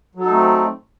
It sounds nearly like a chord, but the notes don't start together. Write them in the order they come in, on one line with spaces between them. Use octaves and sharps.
F#3 A4 D#4 A3 C4